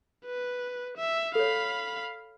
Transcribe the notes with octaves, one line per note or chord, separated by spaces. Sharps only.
B4
E5
A4 C#5 F5 B5